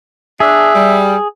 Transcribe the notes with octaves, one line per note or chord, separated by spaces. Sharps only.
D4 G#4 E5
G3